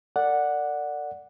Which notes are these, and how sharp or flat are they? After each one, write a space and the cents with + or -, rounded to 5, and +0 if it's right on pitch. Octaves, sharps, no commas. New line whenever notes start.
A#4 -45 D5 +0 F#5 -5